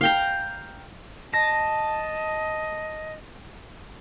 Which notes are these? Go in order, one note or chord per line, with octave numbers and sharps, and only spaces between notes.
F5 G5 A#5
D#5 A5 A#6